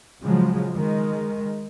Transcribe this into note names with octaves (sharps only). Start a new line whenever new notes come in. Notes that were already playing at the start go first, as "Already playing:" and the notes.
C#3 F3 F#3 G#3
D#3 G#3